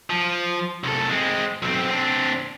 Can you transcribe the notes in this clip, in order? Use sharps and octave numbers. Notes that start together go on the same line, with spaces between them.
F3
C2 A4
G#3 C4
B1 C4
C4 D4